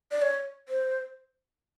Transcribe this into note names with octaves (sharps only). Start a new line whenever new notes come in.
D5
C#5
C5